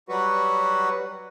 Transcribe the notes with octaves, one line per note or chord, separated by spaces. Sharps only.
F#3 G3 F#4 B4